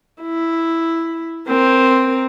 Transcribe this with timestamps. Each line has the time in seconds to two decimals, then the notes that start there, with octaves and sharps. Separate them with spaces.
0.22 E4
1.48 C4 A#4